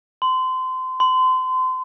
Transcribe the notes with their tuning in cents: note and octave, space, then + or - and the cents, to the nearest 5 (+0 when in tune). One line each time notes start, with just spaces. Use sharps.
C6 -25
C6 -30